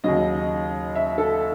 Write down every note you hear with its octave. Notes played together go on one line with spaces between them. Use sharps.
D#2 C#3 F#3 D#5
E5
A4